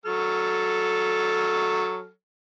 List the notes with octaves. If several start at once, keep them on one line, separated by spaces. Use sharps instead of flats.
F#3 A4 F6